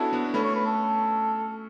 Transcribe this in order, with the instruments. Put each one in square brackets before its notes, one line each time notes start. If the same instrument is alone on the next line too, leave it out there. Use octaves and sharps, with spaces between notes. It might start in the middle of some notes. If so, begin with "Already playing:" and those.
Already playing: [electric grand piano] B3 C#4 D4 E4 F#4 [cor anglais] A4
[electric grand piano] B3 D4
[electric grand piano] A3 C#4 [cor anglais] B4
[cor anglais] C#5
B4
A4